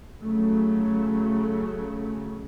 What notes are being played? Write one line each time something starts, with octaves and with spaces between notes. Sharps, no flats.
C#3 F#3 A3